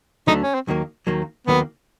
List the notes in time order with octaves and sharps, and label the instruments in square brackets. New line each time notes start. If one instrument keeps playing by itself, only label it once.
[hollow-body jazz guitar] D2 D3 F#3 A3 [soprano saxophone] D#4
[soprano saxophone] C#4
C4
[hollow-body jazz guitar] D#2 D#3 F#3 A#3
D#2 D#3 F#3 A#3
[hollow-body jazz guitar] D#2 D#3 F#3 A#3 [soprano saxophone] B3